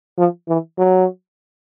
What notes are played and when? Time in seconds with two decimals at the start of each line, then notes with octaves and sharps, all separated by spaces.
0.18 F3
0.48 E3
0.78 F#3